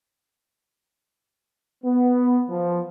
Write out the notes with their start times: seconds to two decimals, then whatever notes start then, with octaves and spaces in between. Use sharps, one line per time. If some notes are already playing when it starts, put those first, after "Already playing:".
1.84 B3
2.49 F3